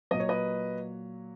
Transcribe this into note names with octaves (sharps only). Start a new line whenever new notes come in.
A#2 F#3 D#5
C#5
B4 D#5